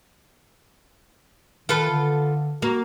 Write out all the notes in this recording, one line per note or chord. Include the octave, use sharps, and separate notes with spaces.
D#3 F4 A4 B4
D3
A#3 F#4